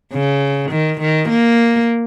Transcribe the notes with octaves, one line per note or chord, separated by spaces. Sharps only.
C#3
D#3
D#3
A#3